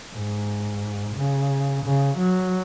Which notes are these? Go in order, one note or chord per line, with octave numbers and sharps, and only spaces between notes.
G#2
C#3
C#3
F#3